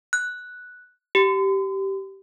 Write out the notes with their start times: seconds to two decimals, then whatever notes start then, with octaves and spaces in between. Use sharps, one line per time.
0.13 F#6
1.15 G4